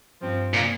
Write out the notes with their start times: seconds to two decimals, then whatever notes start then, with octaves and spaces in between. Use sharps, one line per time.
0.22 G2 F3 C4
0.54 A#2